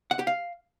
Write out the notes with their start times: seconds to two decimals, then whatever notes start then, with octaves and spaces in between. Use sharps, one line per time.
0.11 F#5
0.19 G4
0.27 F5